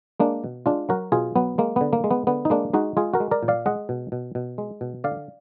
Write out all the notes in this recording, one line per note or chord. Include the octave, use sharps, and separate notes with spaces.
G#3 A#3 D4
B2
G#3 D4 F4
F#3 F#4 A#4
B2 F4 G#4
F#3 B3
G#3 A#3
D3 B3
A#3
G#3
B3
D3 B3
D#4
G#3 A#3 D4
G#3 D#4 F#4
G#3 F4 G#4
F#4 A#4
G#3
A#4 D5
A#2
D5 F5
G#3 D#5 F#5
B2
B2
B2
G#3
B2
D3 D5 F5